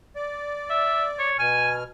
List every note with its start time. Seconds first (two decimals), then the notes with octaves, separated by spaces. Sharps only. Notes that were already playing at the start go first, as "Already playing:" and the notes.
0.16 D5
0.70 E5
1.19 C#5
1.38 B2 G#5 F6